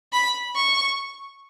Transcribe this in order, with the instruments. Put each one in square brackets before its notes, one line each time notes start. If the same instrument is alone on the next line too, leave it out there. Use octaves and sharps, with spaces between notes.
[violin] B5
C#6